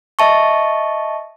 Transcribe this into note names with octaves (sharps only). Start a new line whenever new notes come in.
D#5 E5 A5 C#6